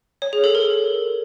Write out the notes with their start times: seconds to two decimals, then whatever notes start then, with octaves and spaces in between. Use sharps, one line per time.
0.22 C#5
0.33 G#4
0.44 A4
0.55 A#4